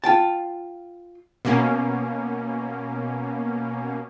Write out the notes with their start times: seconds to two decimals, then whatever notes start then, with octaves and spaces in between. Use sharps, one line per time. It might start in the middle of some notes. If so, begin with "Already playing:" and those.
0.04 F4 G5 A5
1.45 B2 A#3 C#4